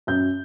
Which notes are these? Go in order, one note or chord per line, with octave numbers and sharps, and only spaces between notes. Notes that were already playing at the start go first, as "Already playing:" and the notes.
F#2 G6